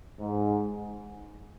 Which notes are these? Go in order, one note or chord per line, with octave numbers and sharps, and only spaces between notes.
G#2